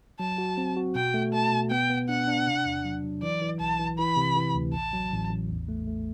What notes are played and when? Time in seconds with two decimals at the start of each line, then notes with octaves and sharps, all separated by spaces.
0.20 F#3 A5
0.38 F#4
0.58 C4
0.77 F#4
0.95 B2 G5
1.14 A3
1.33 A3 A5
1.52 B2
1.71 B3 G5
1.90 B3
2.09 D4 F#5
2.28 D4
2.47 C3
2.66 E2
2.85 F#3
3.04 F#3
3.23 E3 D5
3.42 E3
3.60 B1 A5
3.79 E3
3.98 E3 B5
4.17 C3
4.36 E3
4.55 D2
4.74 A1 A5
4.93 F#3
5.12 A1
5.31 A1
5.50 E2
5.69 A3
5.87 A3